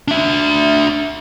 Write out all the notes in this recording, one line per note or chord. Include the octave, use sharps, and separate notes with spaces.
D4 E5